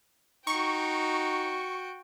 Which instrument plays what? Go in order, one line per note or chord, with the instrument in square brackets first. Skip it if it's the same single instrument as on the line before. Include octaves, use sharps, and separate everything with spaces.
[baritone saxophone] D#4 [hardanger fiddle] F#4 G5 [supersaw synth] C#6